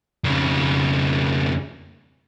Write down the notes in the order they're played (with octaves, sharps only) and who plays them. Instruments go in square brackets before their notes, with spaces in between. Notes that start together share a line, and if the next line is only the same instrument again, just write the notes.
[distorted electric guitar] F2 C#3